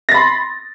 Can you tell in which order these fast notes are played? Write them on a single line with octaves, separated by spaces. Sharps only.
A#6 A6 B5 C6